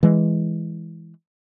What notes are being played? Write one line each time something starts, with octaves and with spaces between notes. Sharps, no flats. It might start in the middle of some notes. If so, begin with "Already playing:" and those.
E3 G#3